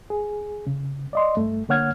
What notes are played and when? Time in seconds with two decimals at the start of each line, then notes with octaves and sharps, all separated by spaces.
0.10 G#4
0.67 C#3
1.13 D5 D#5 C6
1.37 G2 A3
1.69 D3 A#3 C#5 F#5 F6 G#6